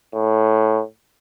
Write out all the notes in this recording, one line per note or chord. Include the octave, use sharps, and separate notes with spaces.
A2